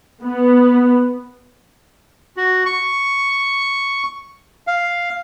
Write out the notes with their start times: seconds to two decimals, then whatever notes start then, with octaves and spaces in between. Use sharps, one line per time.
0.23 B3
2.37 F#4
2.66 C#6
4.67 F5